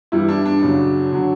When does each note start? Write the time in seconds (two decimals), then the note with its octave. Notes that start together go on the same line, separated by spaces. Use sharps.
0.12 G2 E3 G3 E4
0.28 D4
0.45 D4
0.62 F#2 C#3 F#3
1.12 D3 F#3